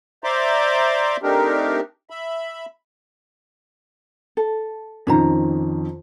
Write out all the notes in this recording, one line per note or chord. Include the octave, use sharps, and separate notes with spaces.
C5 D5 E5 A#5 C6 D6
A3 C4 D4 D#4 G4 A#4
E5 B5
A4
F2 D#3 C#4 C5 A#5